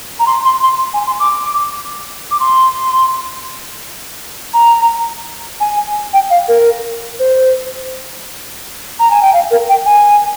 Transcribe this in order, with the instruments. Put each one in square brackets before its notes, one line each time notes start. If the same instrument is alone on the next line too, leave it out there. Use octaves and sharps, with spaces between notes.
[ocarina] A#5
C6
C6
C6
G#5
C6
D6
D6
C6
A#5
G#5
G5
F5
A#4
C5
A#5
G#5
G5
F5
A#4
G5
G#5